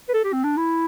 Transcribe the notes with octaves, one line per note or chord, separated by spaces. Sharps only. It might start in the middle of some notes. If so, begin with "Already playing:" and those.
B4
A4
G4
C4
D4
E4